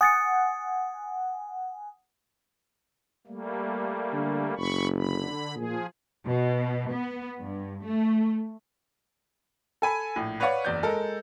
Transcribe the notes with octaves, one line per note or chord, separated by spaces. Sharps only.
F#5 G#5 D#6 A6 C#7
G3 A3 A#3
D3
F#1 B5 C#6
D3 B5
A#2 F3 G#4
B2
B3
G2
A3
A4 G#5 B5
A#1 A2
B4 C#5 D5 F5 F#5 C#6
F#1 E2 D5 G6
G#3 A4 A#4